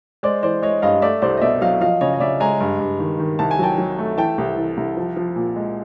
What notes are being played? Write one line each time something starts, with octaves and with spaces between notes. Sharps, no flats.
G#3 C5 D5
E3 C5 D5
G#3 C#5 D#5
G2 D#5 F5
A3 D5 E5
C2 C5 D5
D#5
B2 D5 E5
F#3 D#5 F5
F3 D#5 F5
C#3 C#5 D#5
D#5
C#3 D5 E5
G#3 G#5 A#5
G2
G2
D#3
D#3
C2 A5
G#5
F#3 G5 A5
F#3
A3
E3 G5 A5
C2
E3
C2
F3
F3
A#2
G#3